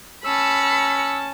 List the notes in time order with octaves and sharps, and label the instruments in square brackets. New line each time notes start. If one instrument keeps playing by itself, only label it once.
[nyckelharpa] C#4 A5 [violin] B5 C#7 [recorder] E6